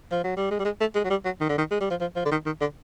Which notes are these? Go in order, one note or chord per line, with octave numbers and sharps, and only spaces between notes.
F3
F#3
G3
G#3
G3
G#3
A3
G#3
F#3
G3
F#3
D#3
D3
D#3
G#3
G3
F3
F3
F3
D3
D#3
D#3
D3